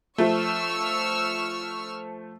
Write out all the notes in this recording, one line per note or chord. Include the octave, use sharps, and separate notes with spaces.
F3 A3 C#6 E6 F6